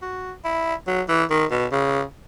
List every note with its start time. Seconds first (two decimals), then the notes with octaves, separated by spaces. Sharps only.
0.02 F#4
0.45 E4
0.87 F#3
1.09 E3
1.30 D#3
1.51 B2
1.72 C#3